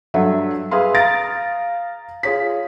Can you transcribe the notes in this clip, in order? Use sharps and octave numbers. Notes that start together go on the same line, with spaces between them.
G2 F#3 A4 E5 F#5
G#4 B4 E5 F5 C6
F5 A#5 D#6 A6 A#6 D7
F4 G#4 C#5 B6